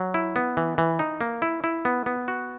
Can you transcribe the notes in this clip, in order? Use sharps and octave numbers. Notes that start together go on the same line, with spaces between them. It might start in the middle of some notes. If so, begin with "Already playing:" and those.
Already playing: F#3
E4
B3
E3
E3
D#4
A#3
E4
E4
B3
B3
F#4